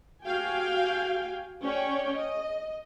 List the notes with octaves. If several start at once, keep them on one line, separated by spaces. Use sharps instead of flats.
F#4 G4 F5 G5 G#5
C#4 C#5 D5 G5
D#5